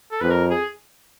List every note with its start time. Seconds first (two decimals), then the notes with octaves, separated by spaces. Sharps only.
0.12 A4
0.21 F2 B4
0.31 A#4
0.50 G#4